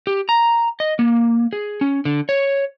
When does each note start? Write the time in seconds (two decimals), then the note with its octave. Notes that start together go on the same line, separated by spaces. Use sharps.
0.07 G4
0.29 A#5
0.80 D#5
0.99 A#3
1.53 G#4
1.81 C#4
2.05 D3
2.29 C#5